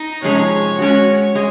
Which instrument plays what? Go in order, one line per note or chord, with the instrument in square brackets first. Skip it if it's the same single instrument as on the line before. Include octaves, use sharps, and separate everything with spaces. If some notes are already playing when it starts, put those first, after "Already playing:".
Already playing: [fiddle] D#4
[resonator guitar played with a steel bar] C3 F3 G#3 C#4 G#4 [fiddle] C#5
[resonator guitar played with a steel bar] G#3 C#4 F#4
G#3